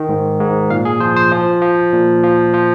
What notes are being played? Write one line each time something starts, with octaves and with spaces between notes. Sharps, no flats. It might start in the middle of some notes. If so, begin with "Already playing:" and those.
Already playing: D#3
G#2
G#2
A#2 F5
G#4
F3 C5
C5
F3
F3
A#2
F3
F3